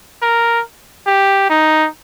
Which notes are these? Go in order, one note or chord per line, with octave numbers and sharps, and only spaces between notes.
A#4
G4
D#4